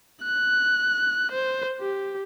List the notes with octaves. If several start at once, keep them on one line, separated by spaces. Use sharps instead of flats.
F#6
C5
G4